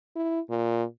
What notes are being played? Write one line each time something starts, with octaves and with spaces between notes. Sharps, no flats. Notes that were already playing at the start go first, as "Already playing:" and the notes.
E4
A#2